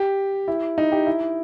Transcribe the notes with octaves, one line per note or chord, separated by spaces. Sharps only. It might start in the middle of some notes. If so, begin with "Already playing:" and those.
Already playing: G4
E4
D#4
G4
E4